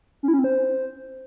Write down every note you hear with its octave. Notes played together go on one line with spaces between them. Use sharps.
C#4
E4
C#4
C4
C5